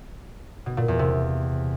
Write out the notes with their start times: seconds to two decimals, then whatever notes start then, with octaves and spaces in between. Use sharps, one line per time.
0.66 B2
0.77 A#2
0.88 E2
0.99 C3